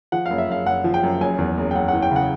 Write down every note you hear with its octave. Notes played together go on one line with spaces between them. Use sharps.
F3 F#5
F#1 F5
E5
F#1 F5
F#1 F#5
F3
G5
F#2
F#1 G#5
E2
F#1
G5
F#1 F#5
E3 F#5
G5
C#3
F#5